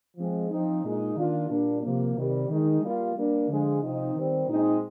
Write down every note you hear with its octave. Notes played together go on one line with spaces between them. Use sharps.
F3 G#3 C4
F3 C4 D#4
A#2 G#3 D#4
D#3 A#3 D4 F4
A#2 G3 A#3 D4
C3 F3 A#3
C3 D#3 G3
D#3 G#3 D#4
G3 A#3 F4
G3 A#3 D4
D3 F3 G#3
C3 F3 C4 D#4
D#3 G3 C4
A#2 G#3 C4 D#4